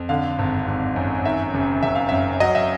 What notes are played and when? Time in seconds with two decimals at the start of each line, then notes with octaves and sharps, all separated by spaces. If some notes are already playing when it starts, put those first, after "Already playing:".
Already playing: F2
0.09 D3 F5
0.39 G#1
0.68 G#1
0.96 F#2
1.25 D#3 E5
1.54 F#1
1.83 F#1 E5
1.95 F5
2.09 F#2 E5
2.40 F#3 D#5
2.55 E5